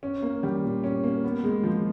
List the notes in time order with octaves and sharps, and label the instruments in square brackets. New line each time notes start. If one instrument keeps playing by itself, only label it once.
[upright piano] C#4
A#3
G3
A#2
C#4
A#3
B3
G#3
F3